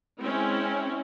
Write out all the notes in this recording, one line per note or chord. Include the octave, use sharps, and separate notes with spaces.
G#3 C4 C#4 E4